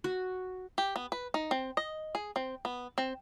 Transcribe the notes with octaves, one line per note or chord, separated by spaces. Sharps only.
F#4
G4
B3
B4
D#4
C4
D#5
G#4
C4
B3
C4